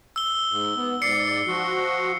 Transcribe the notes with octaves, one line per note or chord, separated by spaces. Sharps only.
E6 G7
G#2
B3
G#2 D5 C7 C#7
F3 F#4